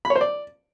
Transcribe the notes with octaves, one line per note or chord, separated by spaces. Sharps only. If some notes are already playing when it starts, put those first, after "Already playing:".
B5
C#5
C5
D5